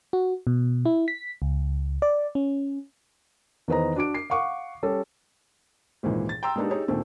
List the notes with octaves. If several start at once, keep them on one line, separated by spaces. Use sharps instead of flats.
F#4
B2
E4
B6
C#2
D5
C#4
E2 D#3 B4 C5 D#5 A#5
D4 F#4 D6 D7
C7
F5 F#5 C#6 D6
G3 C#4 G4 A4
G#1 C#2 A#2 D#3 E3
A6
G5 A#5 C6 E6
G#3 A#3 B3 D4 D#4 G4
D#4 G4 G#4 C#5
D2 A#2 D#3 A3 C4